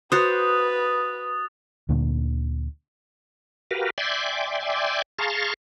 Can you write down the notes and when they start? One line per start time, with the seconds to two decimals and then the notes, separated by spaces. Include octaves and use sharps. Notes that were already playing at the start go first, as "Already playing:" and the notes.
0.12 F#4 B4 C5 D#6 F#6 A6
1.89 D2 A#2 D3 A#3
3.71 F#4 G4 A#4 B4 F5
3.98 D5 E5 G5 G#5 C6 D6
5.19 G#4 F5 A5 A#5 C6 C#6